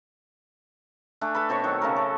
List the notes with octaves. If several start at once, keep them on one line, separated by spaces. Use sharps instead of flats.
A3 D4 G#5
A4 B4 B5
B2 C4 C#5 C#6
D#3 F#3
C#3 A3 F#4 A#4
A4